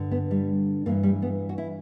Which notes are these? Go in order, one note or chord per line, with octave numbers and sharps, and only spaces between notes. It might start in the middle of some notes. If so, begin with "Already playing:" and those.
Already playing: G2 D3
B3
G3
G2 E3 A#3
G3
B3
F#4
E4